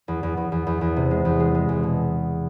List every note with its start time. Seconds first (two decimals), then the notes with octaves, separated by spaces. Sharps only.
0.08 E2
0.23 E2
0.37 E2
0.52 E2
0.67 E2
0.81 E2
0.96 C3
1.11 G#3
1.25 E2
1.40 G#3
1.55 G#3
1.69 E2
1.83 B2